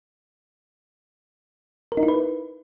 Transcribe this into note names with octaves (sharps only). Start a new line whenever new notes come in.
A#4
D#4
E4
B4